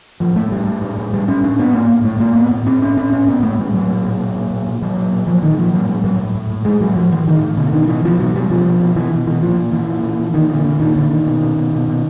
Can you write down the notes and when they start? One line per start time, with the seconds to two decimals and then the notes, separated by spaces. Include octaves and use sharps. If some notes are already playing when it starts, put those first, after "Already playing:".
0.20 A2 F3
0.36 A2 A3
0.52 A2 G3
0.67 A2
0.81 A2
0.98 A2
1.13 A2 G3
1.28 A2 C#4
1.44 A2 D4
1.59 A2 B3
1.74 A2 A#3
1.89 A2
2.04 A2 A3
2.20 A2 A#3
2.35 A2 B3
2.52 A2
2.66 A2 C4
2.82 A2 C#4
2.97 A2 C#4
3.12 A2 C#4
3.28 A2 B3
3.43 A2 A3
3.58 A2 G3
3.74 A2 F#3
3.89 A#2
4.05 A#2
4.20 A#2
4.35 A#2
4.50 A#2
4.67 A#2
4.82 A#2 F#3
4.97 A#2
5.13 A#2
5.27 A#2 F3
5.42 A#2 D#3
5.58 A#2 F3
5.73 A2 F#3
5.89 A2 G3
6.04 A2 F#3
6.19 A2
6.35 A2
6.50 A2
6.65 A2 G#3
6.80 A2 F#3
6.96 A2 F3
7.12 A2 E3
7.27 A2 D#3
7.42 A2
7.57 B2 D3
7.72 B2 D#3
7.88 B2 E3
8.04 B2 F3
8.19 B2 F#3
8.34 B2 G3
8.50 B2 F3
8.65 B2
8.80 B2
8.96 B2 E3
9.12 B2
9.26 B2 E3
9.41 A#2 F3
9.57 A#2
9.72 A#2 E3
9.88 A#2
10.03 A#2
10.19 A#2
10.34 A#2 D#3
10.49 A#2 D3
10.64 A#2 D3
10.79 A#2 D#3
10.96 A#2 D3
11.10 A#2 D#3
11.26 B2
11.41 B2
11.57 B2
11.73 B2
11.88 B2